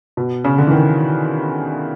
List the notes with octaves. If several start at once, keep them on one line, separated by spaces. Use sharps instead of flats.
B2
C#3
D3
E3
D#3